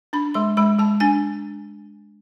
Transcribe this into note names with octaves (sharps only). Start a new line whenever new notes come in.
D4 B5
G#3 C6
G#3 B5
G#3 A5
D4 G#5